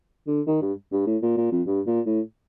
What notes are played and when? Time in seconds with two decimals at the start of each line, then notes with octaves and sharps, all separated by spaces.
0.27 D3
0.47 D#3
0.62 G2
0.92 G2
1.07 A2
1.22 A#2
1.37 A#2
1.52 F2
1.67 G2
1.87 A#2
2.06 A2